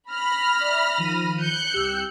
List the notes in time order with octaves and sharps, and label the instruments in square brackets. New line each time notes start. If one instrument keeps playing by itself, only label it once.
[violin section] B5 F6 A#6
[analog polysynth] D5 E5
D#3 F3 D#7
[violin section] F#6 G6 C#7
[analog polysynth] C2 G4 E6